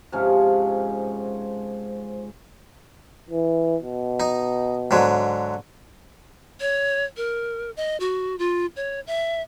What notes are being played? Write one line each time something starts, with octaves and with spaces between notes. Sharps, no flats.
G#2 C3 F3 C#4
E3
B2
D#4
G#2 D3 F#3
C#5
A#4
D#5
F#4
F4
C#5
E5